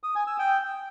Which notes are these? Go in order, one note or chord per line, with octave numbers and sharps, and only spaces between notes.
D#6
G#5
E6
G5